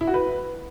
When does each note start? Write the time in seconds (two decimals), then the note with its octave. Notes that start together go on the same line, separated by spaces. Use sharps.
0.01 E4
0.07 F#4
0.14 B4